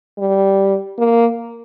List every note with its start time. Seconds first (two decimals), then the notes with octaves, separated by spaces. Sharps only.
0.18 G3
0.98 A#3